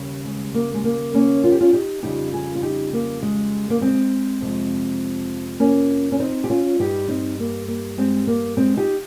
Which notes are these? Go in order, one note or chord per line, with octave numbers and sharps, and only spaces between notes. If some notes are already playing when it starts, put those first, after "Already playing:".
Already playing: D#2 C#3 G3
G#3
A#3
G#3
A#3
A#3 C#4
F4
G4
C#4 F4
D#4 G4
F2 C#3 G3 D#4 G4
F4 G#4
F4
D#4 G4
A#3
G#3
A#3
G#3 C4
F2 C3 F3 G#3
A#3 C#4
C#4
C4 D#4
G4
C#4 F4
G2 G3 D#4 G4
C4 D#4
A#3
A#3
G#3 C4
A#3
G#3 C4
D#4 G4